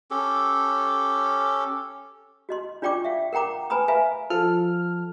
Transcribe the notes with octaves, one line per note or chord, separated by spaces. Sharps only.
C#4 G4 A4
F#4 D#5 C6
D4 F4 D5 G5 C#6 D6
E5 F5
A#4 F#5 G5 A#5 D6
B4 G#5 A#5 B5 D#6
B4 E5 F5 G#5 A#5 B5
F3 A4 F6